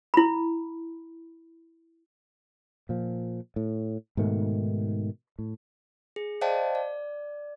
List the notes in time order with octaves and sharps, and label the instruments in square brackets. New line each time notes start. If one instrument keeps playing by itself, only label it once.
[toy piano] E4 B5
[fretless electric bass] A#2 F3
A2
G#2 B2 D#3 A3
A2
[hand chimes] G#4
C5 D5 D#5 F5 G5 A5
D5